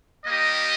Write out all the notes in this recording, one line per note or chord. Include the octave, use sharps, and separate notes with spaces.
G3 A#3 D#4 G4 D#5